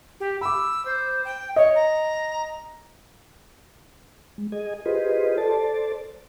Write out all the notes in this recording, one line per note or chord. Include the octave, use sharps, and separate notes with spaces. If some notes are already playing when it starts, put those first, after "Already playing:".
G4
B5 D6 E6
C5
G5
C#5 D#5
A#5
G#3
G#4 D#5 G#5
F4 G4 G#4 B4 C5 D#5
A4 C5 D5 A5